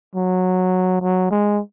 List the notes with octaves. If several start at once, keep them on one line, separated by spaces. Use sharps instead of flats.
F#3
F#3
G#3